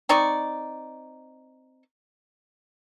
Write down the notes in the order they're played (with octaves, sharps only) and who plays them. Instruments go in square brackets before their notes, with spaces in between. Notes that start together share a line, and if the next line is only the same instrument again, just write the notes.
[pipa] C4 D#4 D5 C#6